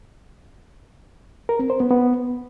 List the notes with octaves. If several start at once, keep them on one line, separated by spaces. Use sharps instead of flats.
A#4
C4
C5
B3
B3